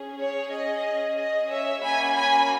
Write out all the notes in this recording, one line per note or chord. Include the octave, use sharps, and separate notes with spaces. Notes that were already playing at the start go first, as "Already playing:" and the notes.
Already playing: C#4 G#4
C#5
D#5
D#5
C#5 E5
A#3 C#4 F#4 G#5 B5
G#5 B5